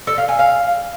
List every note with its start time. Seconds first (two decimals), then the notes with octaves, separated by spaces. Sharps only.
0.07 A4
0.18 F5
0.28 G#5
0.39 F5